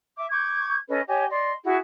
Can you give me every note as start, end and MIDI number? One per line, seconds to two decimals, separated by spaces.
0.15 0.26 76
0.15 0.26 86
0.30 0.75 85
0.30 0.75 86
0.30 0.75 91
0.30 0.75 92
0.89 1.00 61
0.89 1.00 69
0.89 1.00 71
0.89 1.00 75
1.07 1.24 67
1.07 1.24 73
1.07 1.24 75
1.07 1.24 80
1.29 1.51 74
1.29 1.51 75
1.29 1.51 84
1.64 1.76 64
1.64 1.76 66
1.64 1.76 68